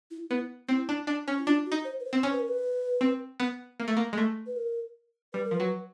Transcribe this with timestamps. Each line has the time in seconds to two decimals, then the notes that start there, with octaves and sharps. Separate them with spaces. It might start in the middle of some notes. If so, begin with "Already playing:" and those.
0.11 E4
0.30 B3 E4
0.69 C4 E4
0.89 D4
1.07 D4
1.28 C#4
1.39 E4
1.46 D4 F4
1.66 F#4
1.72 D#4
1.85 C5
2.00 B4
2.05 C5
2.13 C4
2.23 C#4 C5
2.32 B4
2.39 A#4
2.48 B4
3.01 C4
3.40 B3
3.80 A#3
3.88 A3
3.97 A#3
4.13 G#3
4.18 A3
4.46 B4
4.56 A#4
5.34 G3 B4
5.45 A#4
5.51 F3 B4
5.60 F#3